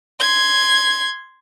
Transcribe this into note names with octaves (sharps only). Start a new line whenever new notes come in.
C6 G#6